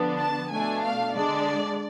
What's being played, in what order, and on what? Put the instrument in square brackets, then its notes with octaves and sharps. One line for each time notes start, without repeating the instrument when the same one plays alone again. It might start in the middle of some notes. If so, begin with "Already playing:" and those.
Already playing: [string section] D3 F3 B3 D4
A5
B2 A3 D4 G#5
F5
D3 G#3 D4 D5